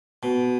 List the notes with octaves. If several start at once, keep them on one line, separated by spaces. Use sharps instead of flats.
B2